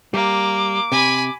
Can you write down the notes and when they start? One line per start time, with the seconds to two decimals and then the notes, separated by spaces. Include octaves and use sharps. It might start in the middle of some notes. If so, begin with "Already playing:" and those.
0.14 G3 A#3 D6
0.92 C3 G#5 B5